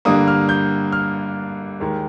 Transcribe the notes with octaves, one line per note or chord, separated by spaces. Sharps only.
G2 D3 G3 A#3 D#6
F6
G6
F6
D#2 D#3 G#3